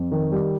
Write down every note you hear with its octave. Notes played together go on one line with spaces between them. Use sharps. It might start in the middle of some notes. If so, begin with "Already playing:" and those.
Already playing: F2
D#3
G3